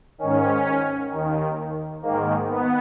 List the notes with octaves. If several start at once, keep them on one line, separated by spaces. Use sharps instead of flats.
G#2 D#3 C#4
D#2 D#3
G#2 D#3 A#3
B3